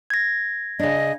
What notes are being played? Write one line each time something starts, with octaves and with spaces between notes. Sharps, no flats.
G#6 A#6
C#3 D4 D#5